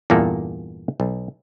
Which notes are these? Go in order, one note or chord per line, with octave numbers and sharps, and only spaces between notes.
E2 G2 A#2 A#3 A4
B1